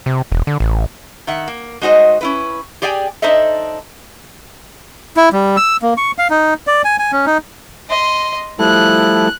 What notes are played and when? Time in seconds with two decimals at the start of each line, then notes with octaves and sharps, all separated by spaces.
0.06 C3
0.32 E1
0.47 D3
0.60 A1
1.27 D#3 E5 F#5
1.48 A#3
1.82 G#3 D#4 F#4 C5 D#5
2.21 C#4 E4 B4
2.82 G4 G#4 D5 F5 G5 G#5
3.22 D4 D#4 A4 C5 D#5 E5
5.17 E4
5.33 G3
5.57 E6
5.82 A#3
5.97 C#6
6.18 F5
6.30 D#4
6.67 D5
6.85 G#5
6.99 G#5
7.12 C#4
7.26 D#4
7.89 D#5 C6
8.59 F3 G3 A3 E4 A4 F#6